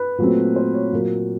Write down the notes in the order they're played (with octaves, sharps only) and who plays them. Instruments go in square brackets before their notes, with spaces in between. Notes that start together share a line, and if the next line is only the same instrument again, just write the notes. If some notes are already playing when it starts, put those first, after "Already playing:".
Already playing: [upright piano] B4
A#2 F#3 A3 C4
C5
C#5
A#2 F#3 A#3